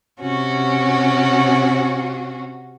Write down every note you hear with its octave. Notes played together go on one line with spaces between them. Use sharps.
C3 C#4 F#4